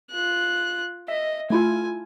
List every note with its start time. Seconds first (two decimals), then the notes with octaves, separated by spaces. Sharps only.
0.11 F4 F#6
1.08 D#5 E5
1.50 A3 E4 F4 G#5